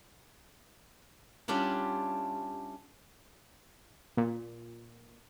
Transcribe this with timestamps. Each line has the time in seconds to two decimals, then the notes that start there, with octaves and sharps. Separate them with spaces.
1.48 G3 C#4 D4 E4 F4
4.17 A#2